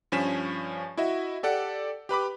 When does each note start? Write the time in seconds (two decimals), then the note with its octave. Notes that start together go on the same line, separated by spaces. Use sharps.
0.12 G2 F3 C#4 G#5 B6 E7
0.97 E4 F#4 D#5 E5
1.43 G4 A4 D5 F#5
2.09 G4 B4 B5 D6